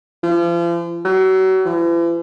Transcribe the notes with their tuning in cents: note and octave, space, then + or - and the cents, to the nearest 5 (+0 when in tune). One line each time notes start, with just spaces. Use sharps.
F3 -40
F#3 +35
E3 +45